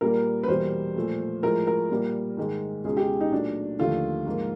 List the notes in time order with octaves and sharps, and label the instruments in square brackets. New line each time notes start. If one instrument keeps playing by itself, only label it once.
[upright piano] A#2 G3 A#3 A#4
B4
E2 B2 G3 A#3 C5
A#2 F3 A3
A2 F3 G#3 A#4
A#4
A#2 G3 A#3
G#2 D#3 G#3
C#2 B2 G#3 G#4
G4
D#4
A#2 F#3 A3 D4
D#2 D3 F3 A3 F4
G#2 F3 A#3